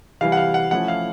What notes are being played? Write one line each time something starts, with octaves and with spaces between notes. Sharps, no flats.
C3 E3 G3 F5
F#5
F5
F#5
F3 A3 C#4 E4 F#5
F5